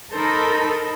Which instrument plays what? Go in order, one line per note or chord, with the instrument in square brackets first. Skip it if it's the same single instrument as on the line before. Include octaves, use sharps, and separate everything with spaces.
[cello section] D#4 A4 A#4 [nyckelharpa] C5 B5